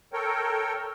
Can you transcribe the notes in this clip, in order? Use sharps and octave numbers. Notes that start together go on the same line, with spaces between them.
A4 A#4 C#5 G5